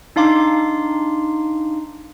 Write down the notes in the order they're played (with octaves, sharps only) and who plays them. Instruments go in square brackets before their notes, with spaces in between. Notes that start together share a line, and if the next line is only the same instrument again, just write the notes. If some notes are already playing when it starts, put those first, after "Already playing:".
[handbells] D4 D#4 F5 C6 D6